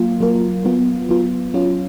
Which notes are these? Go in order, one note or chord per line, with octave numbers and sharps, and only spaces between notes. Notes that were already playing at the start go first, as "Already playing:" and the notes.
Already playing: F#3 A#3 F4
F#3 A#3 F4 A#4
F#3 B3 F4
F#3 B3 F4
F#3 C#4 F4